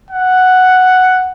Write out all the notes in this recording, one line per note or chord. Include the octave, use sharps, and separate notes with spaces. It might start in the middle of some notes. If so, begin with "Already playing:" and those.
F#5